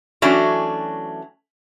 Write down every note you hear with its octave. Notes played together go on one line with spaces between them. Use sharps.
E3 F#3 A3 C#4 D4 F#4